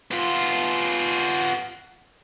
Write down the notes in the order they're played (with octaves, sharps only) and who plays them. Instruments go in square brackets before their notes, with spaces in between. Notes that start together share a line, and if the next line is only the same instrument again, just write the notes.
[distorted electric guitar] B3 F4